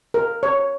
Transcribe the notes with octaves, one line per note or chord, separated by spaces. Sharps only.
A#4
C#5